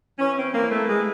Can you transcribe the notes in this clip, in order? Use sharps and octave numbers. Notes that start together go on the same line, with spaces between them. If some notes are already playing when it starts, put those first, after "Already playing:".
E3 C#4
C4
E3 A#3
A3
G#3